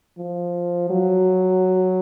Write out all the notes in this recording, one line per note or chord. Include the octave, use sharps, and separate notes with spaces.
F3
F#3